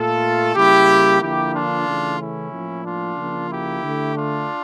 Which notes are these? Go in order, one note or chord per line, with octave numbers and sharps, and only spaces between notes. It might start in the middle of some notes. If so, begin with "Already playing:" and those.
Already playing: A#2 A3 F4 A4
C#3 G3 A#3 E4 G4
D3 F3 A#3 E4 G4
D4 F4
C#3 E3 A3
C#4 E4
A2 F3 A#3
D4 F4
C#3 F3 A#3
E4 G4
D3 A3
D4 F4